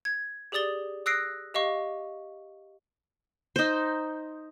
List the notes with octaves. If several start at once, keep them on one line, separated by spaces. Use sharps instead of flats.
G#6
G4 G#4 D5 D#6 A6 G7
D#6 E6 F#6 A#6 C7 D7
G4 D#5 F5 C#6
D#4 C5